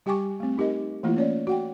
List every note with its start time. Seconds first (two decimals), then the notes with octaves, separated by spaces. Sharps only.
0.06 G3 G4 G5 G#5 C#6 D6
0.40 A3 C4
0.58 D#4 G4 A#4 D#5
1.03 E3 A3 A#3 E4 F4
1.16 C#4 C#5 D5
1.47 F#4 F#5 G5